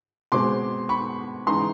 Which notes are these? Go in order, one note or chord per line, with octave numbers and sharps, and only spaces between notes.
B2 G#3 C4 C6 D6
B5 C#6
C#3 E3 G#3 B3 D#4 A#5 C6